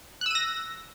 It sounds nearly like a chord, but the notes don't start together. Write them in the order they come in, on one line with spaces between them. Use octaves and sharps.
F#6 E6 D#7 A#6